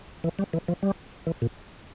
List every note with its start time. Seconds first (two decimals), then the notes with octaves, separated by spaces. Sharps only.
0.24 E3
0.39 G3
0.53 E3
0.68 F3
0.83 G3
1.27 E3
1.42 A#2